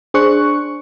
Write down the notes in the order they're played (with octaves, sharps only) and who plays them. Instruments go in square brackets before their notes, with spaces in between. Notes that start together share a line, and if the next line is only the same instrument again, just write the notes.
[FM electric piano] D4 G#4 C5 C#6 F#6 C#7